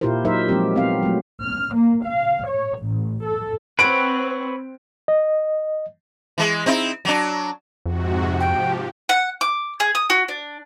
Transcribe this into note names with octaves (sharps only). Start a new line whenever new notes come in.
A#2 E4 F4 G4 A#4 C5
F#3 D#4 A#4 C5 E5
F3 F#3 G#3 C4 G4
B3 C4 F5
F#3 A3
F6
A#3
F5
C#5
A1
A4
C4 B4 C#5 F#5 D7
D#5
E3 G#3
C4 D#4 E4
F#3 D4
F2 G#2 C3 F#4
F3 G4 G5
F#5
D6
G#4
D#6
F#4
D4